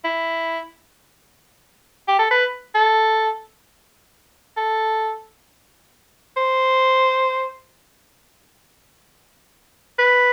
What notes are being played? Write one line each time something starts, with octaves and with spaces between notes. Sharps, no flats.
E4
G4
A4
B4
A4
A4
C5
B4